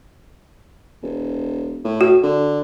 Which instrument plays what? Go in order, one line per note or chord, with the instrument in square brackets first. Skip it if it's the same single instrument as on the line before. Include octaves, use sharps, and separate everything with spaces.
[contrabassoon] E1
A2
[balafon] F#4
[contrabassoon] D3